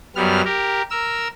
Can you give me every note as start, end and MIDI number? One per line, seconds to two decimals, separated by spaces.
0.16 0.41 42
0.16 0.41 55
0.16 0.41 59
0.16 0.41 89
0.44 0.82 67
0.44 0.82 70
0.90 1.28 70
0.90 1.28 88